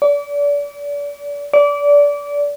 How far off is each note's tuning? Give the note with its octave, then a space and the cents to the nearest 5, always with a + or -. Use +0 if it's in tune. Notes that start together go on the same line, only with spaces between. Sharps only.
D5 -35
D5 -25